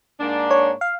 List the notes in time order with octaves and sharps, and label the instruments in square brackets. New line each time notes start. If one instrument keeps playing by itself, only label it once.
[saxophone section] G#2 A#3 D4
[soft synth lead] C#5
F5